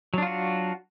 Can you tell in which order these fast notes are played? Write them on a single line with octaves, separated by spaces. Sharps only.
F#3 D4 F4 F#4